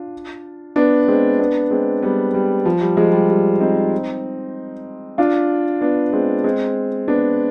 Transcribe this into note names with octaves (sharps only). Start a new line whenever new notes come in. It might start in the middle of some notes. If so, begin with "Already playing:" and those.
Already playing: D4 F4
B3 D4
G#3 C4
B3 D4
G#3 C4
G3 B3
G3
F3
G3
F3 G#3
G3
G3
C4 D#4
D4 F4
B3 D4
G#3 C4
G#3 C4
B3 D4